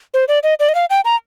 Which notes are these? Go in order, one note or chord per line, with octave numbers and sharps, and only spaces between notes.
C5
D5
D#5
D5
D#5
F5
G5
A#5